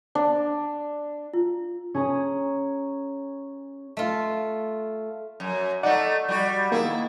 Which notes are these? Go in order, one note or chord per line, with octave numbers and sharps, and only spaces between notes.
D4
F4
C#4 G#4 A#5
A3 F4
F#2
A3 D#4 D5 F#5
G3 F#4
D#3 A#3 E4 G#4